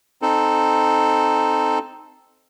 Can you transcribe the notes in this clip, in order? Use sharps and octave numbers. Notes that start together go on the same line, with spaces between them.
C4 D#4 A4